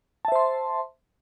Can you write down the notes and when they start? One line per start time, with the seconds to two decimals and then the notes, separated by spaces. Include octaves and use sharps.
0.25 A5
0.28 E5
0.32 C5
0.36 C6